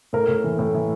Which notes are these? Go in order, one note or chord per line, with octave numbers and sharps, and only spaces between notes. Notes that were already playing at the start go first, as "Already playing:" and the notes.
A2 A#4
A2
E3
A2
E3